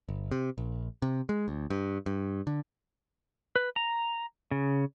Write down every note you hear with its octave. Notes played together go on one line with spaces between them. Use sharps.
G1
C3
A#1
C3
G#3
D2
G2
G2
D3
B4
A#5
C#3